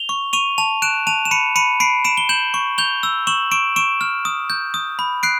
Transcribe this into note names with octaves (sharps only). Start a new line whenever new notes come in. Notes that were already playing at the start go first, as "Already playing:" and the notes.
Already playing: F7 G7
C#6
C#6 D#7 F7
A5 D#7 F7
F#6 D7 E7
A5 D#7 F7
E7
B5 C#7 D#7
B5 C#7 D#7
B5 C7 D7
B5 D7 E7
G7
G6 E7 F#7
C#6
G6 F7 G7
E6
C#6 E7 F#7
C#6 D7 E7
C#6 D7 E7
F6
D#6
G6
D#6
B5
F#6 C7 D7